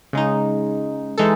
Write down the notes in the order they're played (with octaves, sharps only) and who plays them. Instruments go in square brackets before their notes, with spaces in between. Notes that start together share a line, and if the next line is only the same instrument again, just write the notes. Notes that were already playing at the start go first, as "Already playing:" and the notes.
[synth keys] C#3 G#3 D#4
E3 G#3 D#4 A4